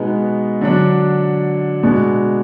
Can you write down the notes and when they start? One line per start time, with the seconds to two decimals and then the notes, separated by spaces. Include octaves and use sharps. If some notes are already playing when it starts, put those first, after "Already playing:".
Already playing: B2 G#3 B3 D#4
0.61 D3 F#3 D4
1.83 B2 G#3 D4